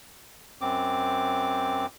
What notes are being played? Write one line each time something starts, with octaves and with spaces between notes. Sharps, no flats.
F#2 C4 D6